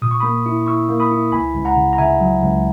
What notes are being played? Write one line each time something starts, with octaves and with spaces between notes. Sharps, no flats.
A#2 D#6
C#6
A#3 B5 D#6
E4
E4 C#6 E6
A#3
B5 D#6
E4
C#2 G#5 B5
C#2
F#5 A#5
C#3
A#5
C#3 E5 G#5
F#3
C#2